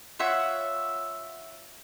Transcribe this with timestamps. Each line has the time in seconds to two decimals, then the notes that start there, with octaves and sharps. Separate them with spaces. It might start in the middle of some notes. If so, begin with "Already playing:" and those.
0.19 F4 C#5 E5 F#5